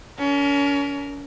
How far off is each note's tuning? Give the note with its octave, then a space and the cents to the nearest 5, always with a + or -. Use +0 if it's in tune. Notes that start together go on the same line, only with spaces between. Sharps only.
C#4 +35 A#4 +0